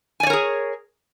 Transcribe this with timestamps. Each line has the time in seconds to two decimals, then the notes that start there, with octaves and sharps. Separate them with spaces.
0.20 G#5
0.23 D5
0.27 C#5
0.30 A#4
0.33 G#4